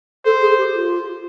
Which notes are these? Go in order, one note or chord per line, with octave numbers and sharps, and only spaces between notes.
A4 C5
G#4
G4
F4